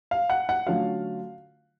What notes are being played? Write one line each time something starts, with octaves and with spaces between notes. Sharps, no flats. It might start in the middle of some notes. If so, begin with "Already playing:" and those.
F5
F#5
F#5
D3 F#3 A3 C#4 F4 F5